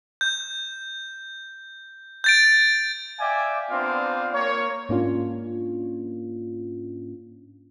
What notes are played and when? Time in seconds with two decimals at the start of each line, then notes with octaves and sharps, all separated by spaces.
0.21 G6
2.24 G6 A6 D7
3.20 D5 E5 F5 G5 G#5 D6
3.70 B3 C4 D4 F4 D5 F5
4.33 A#3 C#5
4.89 G#2 A#3 C#4 D4 F4